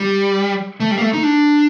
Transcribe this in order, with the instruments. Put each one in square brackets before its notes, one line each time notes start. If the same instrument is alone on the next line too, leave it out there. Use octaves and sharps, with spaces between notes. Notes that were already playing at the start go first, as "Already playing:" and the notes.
Already playing: [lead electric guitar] G3
A3
G3
A#3
A3
D#4
D4